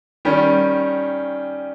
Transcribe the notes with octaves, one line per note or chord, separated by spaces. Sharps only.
D#3 G3 C#4